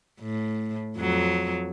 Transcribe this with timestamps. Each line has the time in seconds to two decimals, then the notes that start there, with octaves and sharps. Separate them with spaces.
0.20 A2
0.97 F2 F#3